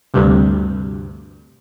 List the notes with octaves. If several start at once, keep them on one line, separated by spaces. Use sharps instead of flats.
D2 G2 C3